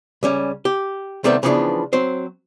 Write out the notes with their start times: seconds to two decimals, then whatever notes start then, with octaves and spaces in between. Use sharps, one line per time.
0.23 C#2 G3 C#4
0.65 G4
1.24 C3 D#3 G3 A3 B3 C4
1.43 C#3 E3 F3 B3 C#4 D4
1.93 F#3 C4 C5